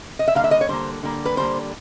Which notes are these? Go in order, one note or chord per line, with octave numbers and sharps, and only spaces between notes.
D#5
E5
D3 G3 A#3 F5
E5
D#5
C#5
D3 G3 A#3 C5
D3 G3 A#3
B4
D3 G3 A#3 C5